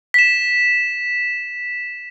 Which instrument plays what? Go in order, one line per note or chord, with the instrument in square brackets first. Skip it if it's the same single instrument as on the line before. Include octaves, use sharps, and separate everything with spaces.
[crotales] B6 E7